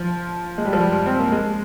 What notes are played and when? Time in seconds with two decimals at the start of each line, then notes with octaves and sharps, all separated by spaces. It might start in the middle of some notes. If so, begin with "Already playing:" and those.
Already playing: F3
0.58 G#3
0.65 G3
0.73 F3
0.80 G3
1.06 C4
1.19 A#3
1.32 G#3